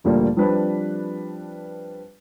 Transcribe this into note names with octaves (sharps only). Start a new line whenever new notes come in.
D2 A#2 F3 G3 A3 A#3
F3 G3 C4 D4 B4